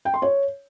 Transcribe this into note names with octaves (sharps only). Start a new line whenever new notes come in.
G5
C6
C#5